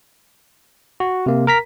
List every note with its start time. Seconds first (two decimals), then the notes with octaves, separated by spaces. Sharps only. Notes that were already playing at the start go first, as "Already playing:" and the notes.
1.00 F#4
1.26 C3 A#3
1.47 A#4 A#5 B6